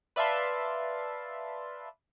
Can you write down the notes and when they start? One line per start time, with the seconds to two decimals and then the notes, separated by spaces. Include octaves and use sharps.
0.16 B4 D5 E5 F5 A5 C6